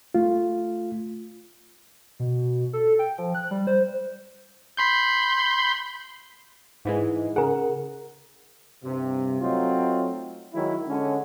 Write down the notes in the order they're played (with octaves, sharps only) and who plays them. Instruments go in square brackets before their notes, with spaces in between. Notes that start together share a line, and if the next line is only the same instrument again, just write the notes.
[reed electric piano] A3 F4
[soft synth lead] B2
A4
G5
F3
F#6
G3
C5
[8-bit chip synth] B5 C6 G6
[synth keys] G#2 E3 G#3
[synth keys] C#3 F#5 [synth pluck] G#4 A#4
[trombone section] G2 C3
F#3 A3 C4 D#4 F4
D#3 F#3 G#3 E4
D3 G#3 C#4